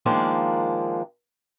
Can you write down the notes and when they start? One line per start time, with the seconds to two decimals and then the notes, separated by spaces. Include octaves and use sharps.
0.06 D#3 F3 G#3 A#3 D4